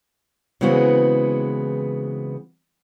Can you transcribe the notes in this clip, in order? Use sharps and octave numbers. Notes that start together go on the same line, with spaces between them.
C#3 E3 G#3 B3 C4 F#4